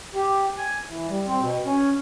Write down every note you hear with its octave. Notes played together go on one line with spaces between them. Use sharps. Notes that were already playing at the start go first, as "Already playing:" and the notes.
G4
G#5
E3
G3
C4
B2
C#4